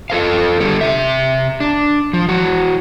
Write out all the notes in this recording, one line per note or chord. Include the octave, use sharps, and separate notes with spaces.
F4 A4 C5 F5
D3 G3 G4 A4
C3 E5
D4
F3
E3 F#4